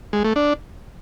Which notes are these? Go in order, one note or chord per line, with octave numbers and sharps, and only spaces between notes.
G#3
A3
D4